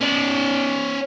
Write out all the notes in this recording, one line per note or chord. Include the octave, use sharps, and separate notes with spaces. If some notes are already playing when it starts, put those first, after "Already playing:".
C#4 D5